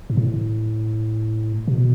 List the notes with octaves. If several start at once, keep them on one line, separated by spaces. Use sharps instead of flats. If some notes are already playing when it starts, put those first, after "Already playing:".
G#2
A2
B2